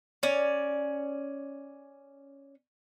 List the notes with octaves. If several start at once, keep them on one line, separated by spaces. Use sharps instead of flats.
C#4 D5